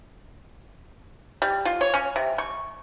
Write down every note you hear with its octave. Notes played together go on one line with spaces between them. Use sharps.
G3
F4
C#5
C#4
C3
C#6